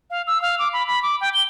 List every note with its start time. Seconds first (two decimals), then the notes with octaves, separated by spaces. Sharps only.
0.10 F5
0.27 E6
0.42 F5
0.59 D6
0.73 B5
0.87 B5
1.02 D6
1.21 G5
1.34 G7